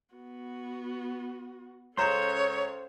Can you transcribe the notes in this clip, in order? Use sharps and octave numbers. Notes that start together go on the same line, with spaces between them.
B3 F#4
C#2 C#4 A4 C5 C#5 A#5 C6 E7